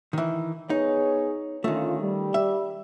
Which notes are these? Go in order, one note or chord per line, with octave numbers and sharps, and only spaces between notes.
D#3 E3
B3 D#4 G#4 C#5
D3 D#3 A3 C#4 F4
G3
E5